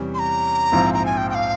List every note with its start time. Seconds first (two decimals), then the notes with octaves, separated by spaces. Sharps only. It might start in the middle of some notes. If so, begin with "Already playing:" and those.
Already playing: E2 C3 E3 G3 C#4
0.14 C6
0.19 A#5
0.72 A#1 G#2 F3 C4 E4
0.94 A#5
1.06 G#5
1.17 G5
1.30 G5
1.35 F5